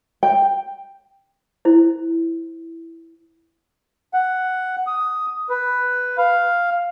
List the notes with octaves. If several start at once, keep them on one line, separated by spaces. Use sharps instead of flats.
G5
E4 C5
F#5
D#6
B4
F5